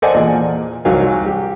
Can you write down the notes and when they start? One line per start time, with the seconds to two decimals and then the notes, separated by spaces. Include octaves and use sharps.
0.02 A4 C5 D5 D#5 F#5 G#5
0.15 E2 A#2
0.85 C2 F#3 D#4 F5 G#5
1.26 G4